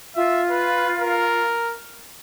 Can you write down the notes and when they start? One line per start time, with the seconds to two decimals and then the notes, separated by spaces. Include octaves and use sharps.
0.15 F4 E5
0.51 B4
1.00 A#4